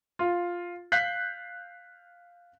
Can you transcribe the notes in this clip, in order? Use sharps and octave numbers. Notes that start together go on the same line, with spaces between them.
F4
F5 F#6 G6 B6 C7